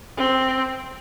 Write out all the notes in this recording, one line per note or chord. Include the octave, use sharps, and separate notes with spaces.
C4